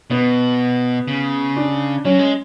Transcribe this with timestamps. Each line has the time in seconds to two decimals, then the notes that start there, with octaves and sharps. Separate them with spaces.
0.10 B2 B3
1.08 C#3
1.57 D4
2.05 F#3 C#4
2.19 G#3